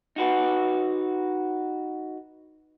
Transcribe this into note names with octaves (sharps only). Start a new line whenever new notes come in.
D#4 F#4 B4